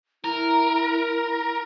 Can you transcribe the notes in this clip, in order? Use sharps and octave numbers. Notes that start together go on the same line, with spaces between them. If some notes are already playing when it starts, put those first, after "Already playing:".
E4 A#4